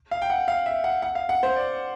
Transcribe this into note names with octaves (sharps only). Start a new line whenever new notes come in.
F5
G5
F#5
F5
E5
F#5
F#5
F5
F#5
C5
D5